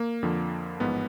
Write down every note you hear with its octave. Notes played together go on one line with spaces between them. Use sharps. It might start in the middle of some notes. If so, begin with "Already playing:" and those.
Already playing: A#3
F2 D3 F3
A1 G#2 F3 B3